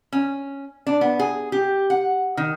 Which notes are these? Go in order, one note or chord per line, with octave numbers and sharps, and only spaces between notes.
C#4
D4
B3
G#4
G4
F#5
D#3